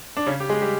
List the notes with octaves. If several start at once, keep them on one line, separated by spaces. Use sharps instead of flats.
D4
C#3 C#4
G4
G#3 G#4
G3 G4